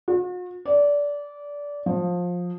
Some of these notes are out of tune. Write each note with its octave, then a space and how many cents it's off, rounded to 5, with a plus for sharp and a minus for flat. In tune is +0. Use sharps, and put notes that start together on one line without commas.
F#4 -45
D5 -20
F3 +20